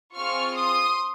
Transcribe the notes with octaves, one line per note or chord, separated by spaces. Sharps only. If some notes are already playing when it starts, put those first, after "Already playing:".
C4 F4 G#4 C#6 F6
C6 D#6